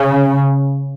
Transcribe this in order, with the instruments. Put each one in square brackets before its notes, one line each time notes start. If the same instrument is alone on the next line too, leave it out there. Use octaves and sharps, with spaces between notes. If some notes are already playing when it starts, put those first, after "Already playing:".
Already playing: [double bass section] C#3